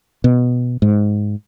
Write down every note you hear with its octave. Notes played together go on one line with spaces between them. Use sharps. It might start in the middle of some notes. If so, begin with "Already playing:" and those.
B2
G#2